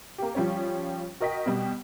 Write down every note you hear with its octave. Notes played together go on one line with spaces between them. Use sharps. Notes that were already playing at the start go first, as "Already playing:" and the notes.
A#3 G4
F3 G3 C#4 C#5
F#4 A#4 D#5 G5 B6
B2 G3